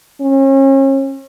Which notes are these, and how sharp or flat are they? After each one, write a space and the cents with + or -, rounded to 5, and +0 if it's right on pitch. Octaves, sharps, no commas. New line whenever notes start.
C#4 -40